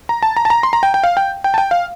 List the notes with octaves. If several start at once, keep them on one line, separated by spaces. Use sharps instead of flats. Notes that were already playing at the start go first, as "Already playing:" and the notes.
A#5
A5
A#5
A5
A#5
C6
A#5
G5
G5
F5
G5
G5
A5
G5
F5